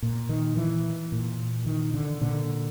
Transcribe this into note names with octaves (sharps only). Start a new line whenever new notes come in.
A#2
D#3
E3
A#2
D#3
D3
A#2 D3